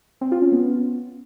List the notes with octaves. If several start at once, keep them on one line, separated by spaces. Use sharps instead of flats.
C4
F4
C#4
B3